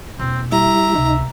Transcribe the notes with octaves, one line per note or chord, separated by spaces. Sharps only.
E1 A#3 C4
G3 E4 E5 A#5
C#2 C3 D#4